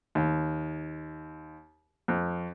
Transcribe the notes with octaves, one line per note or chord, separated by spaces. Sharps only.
D#2
F2